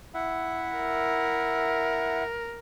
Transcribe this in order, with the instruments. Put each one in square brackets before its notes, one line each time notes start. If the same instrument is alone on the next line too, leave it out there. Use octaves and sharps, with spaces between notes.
[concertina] E4 E5 F#5
[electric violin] A#4